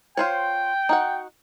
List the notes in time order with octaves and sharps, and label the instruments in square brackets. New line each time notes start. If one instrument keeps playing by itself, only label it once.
[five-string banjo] F4 C5 C#5 [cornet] G5
[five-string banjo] D#4 F#4 F#5